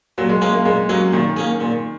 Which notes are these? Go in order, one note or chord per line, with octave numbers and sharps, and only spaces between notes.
A#2 F#3
G#3
G#3 A#3 C#4 G#4
A#3
A#2 G#3
F#3 A#3 C#4 G#4
A#2 D#3
A#3 C#4 G#4
A#2